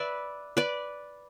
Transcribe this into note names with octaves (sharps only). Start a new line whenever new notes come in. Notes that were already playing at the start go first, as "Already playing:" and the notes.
Already playing: B4 D5 E5
B4 D5